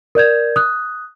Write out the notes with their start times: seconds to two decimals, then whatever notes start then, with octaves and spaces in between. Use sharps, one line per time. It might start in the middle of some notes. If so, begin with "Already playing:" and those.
0.15 A#4 D5 G6 G#6
0.56 D#6 F#6